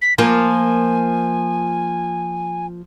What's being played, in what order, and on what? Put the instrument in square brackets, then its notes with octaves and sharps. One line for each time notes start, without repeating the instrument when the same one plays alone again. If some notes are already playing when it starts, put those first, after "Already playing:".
[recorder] B6
[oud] F3 A#3 F4 [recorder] G#5